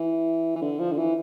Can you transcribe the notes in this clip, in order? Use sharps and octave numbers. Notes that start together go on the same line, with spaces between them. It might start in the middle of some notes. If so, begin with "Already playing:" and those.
Already playing: E3
E3
D3
F3
D3
E3